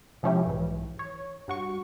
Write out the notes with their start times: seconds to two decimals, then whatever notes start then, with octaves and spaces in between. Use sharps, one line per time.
0.23 C3 F3 G#3 C#4 E4 G4
0.45 B1 G#2 E3
0.99 C#5
1.48 G2 F#4 C#6